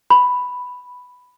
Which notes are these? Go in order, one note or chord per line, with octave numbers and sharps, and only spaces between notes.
B5